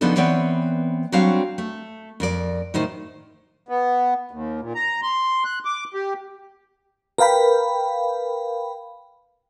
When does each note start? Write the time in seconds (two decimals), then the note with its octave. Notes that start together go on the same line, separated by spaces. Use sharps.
0.01 C#3 F3 B3 D4 D#4 A4
0.16 E3 B3 C4 C#5 D5 G5
1.12 F#3 G3 C4 D4 F#4 F5
1.58 A3
2.20 F2 A#4 D5
2.74 A2 D#3 D#4 C5
3.69 B3
4.31 D#2
4.61 A#2
4.75 A#5
5.03 C6
5.45 F#6
5.65 D6
5.94 G4
7.18 A#4 B4 F5 G5 B5